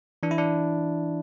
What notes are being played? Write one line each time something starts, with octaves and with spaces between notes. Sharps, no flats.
E3 D4
E4
D4